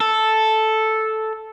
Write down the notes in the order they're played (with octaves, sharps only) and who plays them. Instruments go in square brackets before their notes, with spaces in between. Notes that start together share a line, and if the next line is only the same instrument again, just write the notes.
[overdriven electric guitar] A4